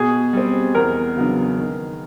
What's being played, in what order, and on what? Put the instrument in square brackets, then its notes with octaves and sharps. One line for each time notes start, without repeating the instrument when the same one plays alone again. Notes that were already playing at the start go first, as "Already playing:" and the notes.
Already playing: [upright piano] B2 [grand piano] G#4
[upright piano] G3 C4
[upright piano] E2 [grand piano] A#4
[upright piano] C#3 F#3 B3 D4
D#3